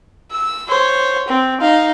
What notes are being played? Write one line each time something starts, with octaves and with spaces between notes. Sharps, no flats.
E6
C5 C#5
C4
D#4 F5